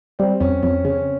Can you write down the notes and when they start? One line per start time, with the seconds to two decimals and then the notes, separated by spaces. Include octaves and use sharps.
0.19 G3 C4
0.40 F2 C#4
0.63 F2 C#4
0.85 C#3 C#4